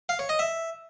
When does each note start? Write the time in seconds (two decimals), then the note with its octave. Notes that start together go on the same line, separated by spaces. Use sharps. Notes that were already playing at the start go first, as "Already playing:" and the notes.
0.09 F5
0.19 C#5
0.29 D#5
0.39 E5